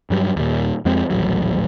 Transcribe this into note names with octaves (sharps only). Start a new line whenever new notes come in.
G2 F#3 G3
D#2 A#2
F2 G#3 C4
D#1 A1 F#3